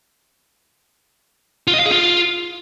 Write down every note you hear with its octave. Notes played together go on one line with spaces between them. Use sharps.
F4
D#5
F5
G#4
F4